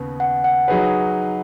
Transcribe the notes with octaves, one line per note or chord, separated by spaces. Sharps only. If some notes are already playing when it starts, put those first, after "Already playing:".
Already playing: D#2 C#3 B3
F#5
F#5
F#3 D#4 G#4 B4